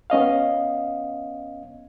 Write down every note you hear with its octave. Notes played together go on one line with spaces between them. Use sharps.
B3 C#4 D#5 F5